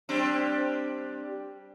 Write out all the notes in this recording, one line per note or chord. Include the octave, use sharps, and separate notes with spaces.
G3 C4 D4